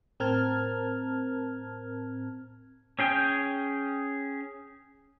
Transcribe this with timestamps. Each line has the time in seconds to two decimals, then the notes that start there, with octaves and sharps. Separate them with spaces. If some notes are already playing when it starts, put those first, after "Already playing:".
0.20 A2 C4 A#4 A5 F6 G#6
2.99 C#4 G#4 G5